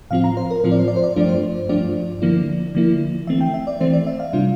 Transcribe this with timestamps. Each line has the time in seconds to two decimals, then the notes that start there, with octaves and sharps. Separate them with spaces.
0.11 A2 F3 C4 F4 F5
0.24 A#5
0.37 C5
0.51 A#4
0.64 A2 F3 C4 F4 C5
0.71 D5
0.79 C5
0.88 D5
0.96 C5
1.04 D5
1.12 C5
1.16 G2 F3 A3 D4 F4 D5
1.29 C5
1.69 G2 F3 A3 D4 F4 D5
2.22 D3 F3 A#3 E4
2.75 D3 F3 A#3 E4
3.27 E3 A3 C4 E5
3.41 G5
3.54 E5
3.67 D5
3.80 E3 A3 C4 C5
3.93 D5
4.07 E5
4.20 F5
4.33 C3 G3 D4 F4